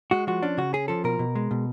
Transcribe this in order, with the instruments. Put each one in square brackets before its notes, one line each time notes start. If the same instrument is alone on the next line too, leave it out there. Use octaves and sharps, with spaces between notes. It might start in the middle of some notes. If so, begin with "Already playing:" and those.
[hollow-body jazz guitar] G#3 F#4
F3 F#4
C#4 D4
C#3 F#4
C#4 G#4
F3 A4
B2 A#4
B2
G#3
B2